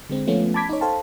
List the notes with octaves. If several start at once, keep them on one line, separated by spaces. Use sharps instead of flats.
D3 G#3 C4
F3 A3 B3 C#4 F4
A5 B5 D6 G#6 B6
D#4 C#5
A4 C5 F5 G5 A5